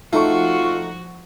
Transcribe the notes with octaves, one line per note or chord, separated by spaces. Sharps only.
F3 A3 D#4 F4 F#4 C#6